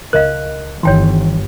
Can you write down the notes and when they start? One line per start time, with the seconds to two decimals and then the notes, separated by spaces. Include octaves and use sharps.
0.13 C#2 A#4 D#5 F5 F#6
0.83 G1 D#3 E3 C#5 G5 C6